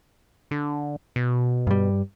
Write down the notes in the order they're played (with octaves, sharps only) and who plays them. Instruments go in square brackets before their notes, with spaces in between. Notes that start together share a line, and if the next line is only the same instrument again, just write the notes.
[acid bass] D3
B2
[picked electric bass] G2 G3